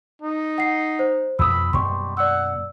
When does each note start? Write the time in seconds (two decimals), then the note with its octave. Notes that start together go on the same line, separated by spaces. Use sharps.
0.22 D#4
0.58 F#5 C7
0.99 C5
1.39 F2 B2 B5 D#6 E6
1.73 F#2 B2 G3 A#3 C6 C#6
2.17 D5 F#5 E6